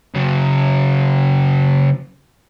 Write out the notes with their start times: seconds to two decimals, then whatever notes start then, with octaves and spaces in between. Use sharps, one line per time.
0.15 C#3 F#3